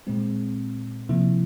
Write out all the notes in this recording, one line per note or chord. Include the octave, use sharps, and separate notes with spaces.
A#2 G#3 C4
C3 F3 A#3 E4